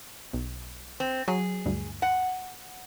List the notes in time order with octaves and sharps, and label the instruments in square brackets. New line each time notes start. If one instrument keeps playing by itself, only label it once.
[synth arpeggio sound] B1
[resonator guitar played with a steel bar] C4
[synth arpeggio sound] F#3 [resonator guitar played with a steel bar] G#4
[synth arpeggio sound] D2 G2
[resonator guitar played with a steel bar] F#5